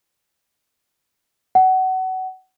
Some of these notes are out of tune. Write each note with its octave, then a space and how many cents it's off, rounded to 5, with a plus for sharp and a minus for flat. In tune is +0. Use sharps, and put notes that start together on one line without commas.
F#5 +25